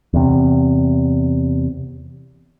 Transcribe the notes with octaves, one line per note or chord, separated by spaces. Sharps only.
E2 C3